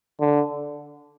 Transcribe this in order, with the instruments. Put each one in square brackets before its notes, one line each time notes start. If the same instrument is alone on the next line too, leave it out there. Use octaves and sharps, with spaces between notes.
[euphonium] D3